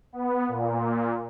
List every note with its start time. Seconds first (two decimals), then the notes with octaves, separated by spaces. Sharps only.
0.13 B3
0.48 A#2